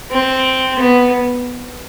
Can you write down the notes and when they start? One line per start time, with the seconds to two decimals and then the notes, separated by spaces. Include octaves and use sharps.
0.11 C4
0.80 B3